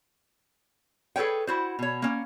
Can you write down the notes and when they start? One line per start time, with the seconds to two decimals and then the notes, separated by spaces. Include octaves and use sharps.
1.16 G#4 A4 B4 C#5 G5
1.47 E4 F#4 C5
1.79 B2 C#5
2.02 A#3 C#4